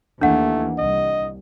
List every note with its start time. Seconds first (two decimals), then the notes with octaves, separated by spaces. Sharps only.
0.22 D#2 E3 A3 A#3 D4 F#5
0.78 C2 D#5